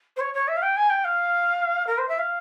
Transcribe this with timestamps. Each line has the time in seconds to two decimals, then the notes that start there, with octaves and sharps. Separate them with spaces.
0.16 C5
0.20 C#5
0.34 C#5
0.48 E5
0.57 F5
0.62 G5
0.77 G#5
0.90 G5
1.04 F5
1.87 A#4
1.98 C5
2.08 E5
2.19 F5